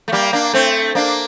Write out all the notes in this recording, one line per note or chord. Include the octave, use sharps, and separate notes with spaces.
A3
G3 A#3
A#3 D4
A3 C4
A#3 D4